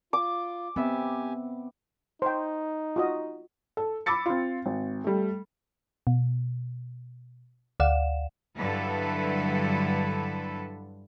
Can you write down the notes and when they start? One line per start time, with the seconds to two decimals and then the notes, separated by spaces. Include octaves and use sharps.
0.13 F4 D6
0.76 B3 C4 G4 E5 G#5
2.22 D#4 C5 G5
2.96 F4 F#4 D#5
3.77 A4
4.06 B5 D6 E6 A6 C#7
4.26 C4 F4
4.66 G#1
5.04 G3 A3
6.07 B2
7.80 D2 D5 F5 F#5 E7
8.57 G2 D3 F#3 E4 A4 B4